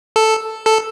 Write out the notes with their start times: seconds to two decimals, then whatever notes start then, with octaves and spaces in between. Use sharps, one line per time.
0.16 A4
0.66 A4